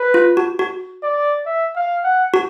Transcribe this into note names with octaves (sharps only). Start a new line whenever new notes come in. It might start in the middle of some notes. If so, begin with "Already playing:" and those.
Already playing: B4
F4
F#4
F#4
D5
E5
F5
F#5
F#4